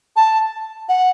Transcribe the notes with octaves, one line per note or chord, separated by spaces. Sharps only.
A5
F#5